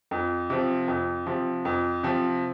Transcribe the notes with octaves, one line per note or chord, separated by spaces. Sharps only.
F2
C3 F3
F2
C3 F3
F2
C3 F3